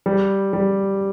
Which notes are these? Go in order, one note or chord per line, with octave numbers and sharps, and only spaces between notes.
G3
G3